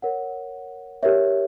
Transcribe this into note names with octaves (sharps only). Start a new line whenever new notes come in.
A#4 C#5 F#5
G4 A#4 C#5 E5